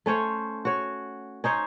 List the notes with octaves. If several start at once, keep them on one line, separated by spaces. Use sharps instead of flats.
A3 C#4 C5 C#5
F#4 C#5
C#4 D#4 C5 C#5